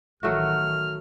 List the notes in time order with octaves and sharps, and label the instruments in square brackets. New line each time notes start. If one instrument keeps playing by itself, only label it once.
[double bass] A1 D#3 [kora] F#3 A3 F#4 [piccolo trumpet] F6